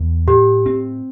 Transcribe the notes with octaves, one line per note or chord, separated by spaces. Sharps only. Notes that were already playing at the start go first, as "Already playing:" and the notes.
Already playing: E2
A2 G4
C4